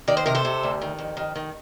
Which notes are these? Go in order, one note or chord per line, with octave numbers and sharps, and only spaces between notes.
D#3 D5
C5
C3 A#4
A4 C5
C3
D2
D#3
F2
D#3
D#3